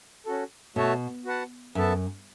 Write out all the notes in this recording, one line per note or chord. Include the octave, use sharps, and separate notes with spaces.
C#4 F#4 A4
B2 A3 F#4 C#5 E5 A5
F#4 B4 F#5 A5
F#2 B3 A4 E5 A5